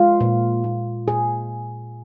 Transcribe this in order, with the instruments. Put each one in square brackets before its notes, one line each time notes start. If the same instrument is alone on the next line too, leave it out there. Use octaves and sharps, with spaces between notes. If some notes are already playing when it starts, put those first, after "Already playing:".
Already playing: [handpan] G#3 F4
A#2
A#2
A#2 G#4